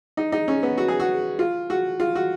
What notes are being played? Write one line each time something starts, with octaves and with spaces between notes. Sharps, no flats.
D#4
D#4
C#4
B3
F#4
G#4
F#4
F4
F#4
F4
F#4